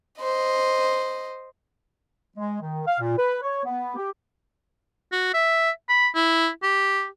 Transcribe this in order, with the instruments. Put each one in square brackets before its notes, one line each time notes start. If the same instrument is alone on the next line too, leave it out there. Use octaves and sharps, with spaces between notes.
[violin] C5 D#5
[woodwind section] G#3
D#3
F5
A#2
B4
C#5
B3
G4
[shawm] F#4
E5
B5
E4
G4